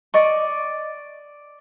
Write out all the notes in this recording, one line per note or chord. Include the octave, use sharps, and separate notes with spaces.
D5 D#5 C#6